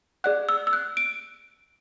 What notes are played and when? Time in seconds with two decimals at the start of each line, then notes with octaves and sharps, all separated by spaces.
0.24 G#4 D5 F#5 F#6
0.49 E6
0.67 E6
0.73 F#6
0.97 D7